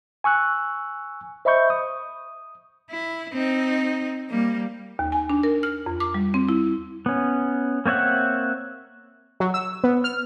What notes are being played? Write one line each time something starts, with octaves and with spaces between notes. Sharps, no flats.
G#5 C#6 E6 F#6
C5 D#5 E5 B5 C#6 G6
D#6
E4
C4 D#4
G3 A#3
D#2
G#5
D4
A#4
F6
F2
D6
G3
C4
E4
B3 C#4
A#3 C4 C#5 E5 F#5
F#3
E6
B3
F6